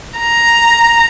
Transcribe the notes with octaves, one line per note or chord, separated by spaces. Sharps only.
A#5